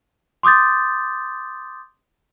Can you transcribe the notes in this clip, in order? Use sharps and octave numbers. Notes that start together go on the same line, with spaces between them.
C6 D6 D#6 G6 A6